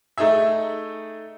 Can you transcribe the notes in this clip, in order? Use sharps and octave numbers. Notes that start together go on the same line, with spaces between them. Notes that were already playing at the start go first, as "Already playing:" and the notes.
A3 D#4 G#4 E5